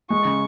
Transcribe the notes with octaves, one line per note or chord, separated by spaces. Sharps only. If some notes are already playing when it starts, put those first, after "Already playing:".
G#3 C#6
C#3